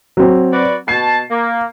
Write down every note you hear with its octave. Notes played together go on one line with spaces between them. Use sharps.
F#3 C4
F#4 B4 D5
B2 A5 C7
A#3